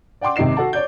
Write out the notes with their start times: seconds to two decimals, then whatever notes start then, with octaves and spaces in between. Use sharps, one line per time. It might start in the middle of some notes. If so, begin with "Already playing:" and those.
0.21 D5 F#5 G5 C6 D6
0.36 G#1 C3 D#3 D#5 C7 E7
0.57 F#4 A4 F#5 A5
0.73 C#5 D5 G6